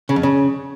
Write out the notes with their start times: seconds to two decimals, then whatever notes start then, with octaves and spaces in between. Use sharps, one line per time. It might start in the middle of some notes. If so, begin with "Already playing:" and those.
0.09 C#3
0.16 F2
0.23 C#3